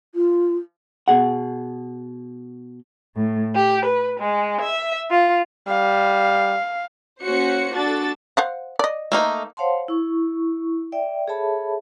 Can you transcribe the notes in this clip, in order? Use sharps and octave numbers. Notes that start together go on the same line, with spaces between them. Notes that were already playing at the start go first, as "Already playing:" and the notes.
F4
B2 G#4 F#5
A2
G4
B4
G#3
E5
F4
G3 F5
A#3 C#4 F#4 C5 C#7
D4 F#4 A4 A6
C5 F5 F#5
D5 D#5
A3 A#3 D#4
C5 C#5 F5 F#5 A5 C6
E4 C#6
D5 E5 G5
G#4 A4 C#5 E5 A5 B5